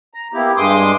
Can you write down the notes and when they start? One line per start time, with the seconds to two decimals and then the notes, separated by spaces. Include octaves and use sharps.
0.14 A#5
0.34 A#3 B3 E4 G4
0.57 G2 G#3 C6 D6 D#6